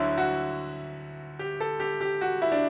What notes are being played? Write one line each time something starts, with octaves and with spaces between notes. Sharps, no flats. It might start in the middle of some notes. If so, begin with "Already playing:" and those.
Already playing: D2 D3 F#3 E4
F#4
G4
A4
G4
G4
F#4
E4
D4